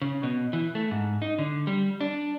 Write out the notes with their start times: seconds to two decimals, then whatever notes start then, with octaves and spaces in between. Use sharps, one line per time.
0.02 C#3
0.23 B2
0.53 E3
0.75 A3
0.91 G#2
1.22 D#4
1.38 D3
1.67 G3
2.01 D4